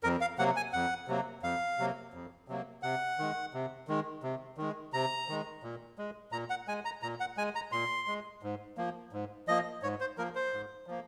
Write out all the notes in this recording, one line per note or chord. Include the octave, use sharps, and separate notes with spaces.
F2 A#4
F5
C3 F#3 A#3 F#5
G#5
F2 F#5
C3 F#3 A#3
F2 F5
C3 F#3 A#3
F2
C3 F#3 A#3
C3 F#5
D#3 G#3
C3
D#3 G#3
C3
D#3 G#3
C3 A#5
D#3 G#3
A#2
G#3
A#2 A#5
F#5
G#3 G#5
A#5
A#2 A#5
F#5
G#3 G#5
A#5
A#2 C6
G#3
G#2
F3 A#3
G#2
F3 A#3 D#5
G#2 C#5
C5
F3 A#3 A#4
C5
G#2
F3 A#3